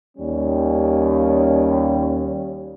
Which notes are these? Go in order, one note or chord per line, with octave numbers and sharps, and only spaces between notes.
D#2 G3 C#4